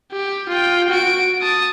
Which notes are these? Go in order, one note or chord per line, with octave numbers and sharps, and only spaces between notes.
G4
F4 G5
F#4 D7
A5 D#6